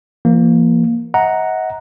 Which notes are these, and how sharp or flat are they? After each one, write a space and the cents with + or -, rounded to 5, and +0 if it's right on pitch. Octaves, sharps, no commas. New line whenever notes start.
F3 -40 A#3 +5
D#5 +40 F#5 +0 A#5 +0